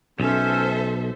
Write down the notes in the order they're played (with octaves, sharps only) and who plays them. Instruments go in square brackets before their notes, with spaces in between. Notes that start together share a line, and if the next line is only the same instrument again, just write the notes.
[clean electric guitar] B1 [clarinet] C#4 [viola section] A4 C5 E5